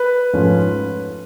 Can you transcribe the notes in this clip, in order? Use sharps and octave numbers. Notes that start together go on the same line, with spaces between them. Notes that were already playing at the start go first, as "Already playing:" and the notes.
Already playing: B4
G#2 F3 A3 C#4